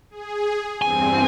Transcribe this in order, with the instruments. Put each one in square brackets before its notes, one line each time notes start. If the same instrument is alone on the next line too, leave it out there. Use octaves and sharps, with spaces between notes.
[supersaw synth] G#4
[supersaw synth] E2 G2 C4 [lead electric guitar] G#5